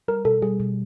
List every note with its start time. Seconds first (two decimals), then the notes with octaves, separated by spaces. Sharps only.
0.08 G3 A#4
0.25 B2 A4
0.42 G3 G#4
0.60 B2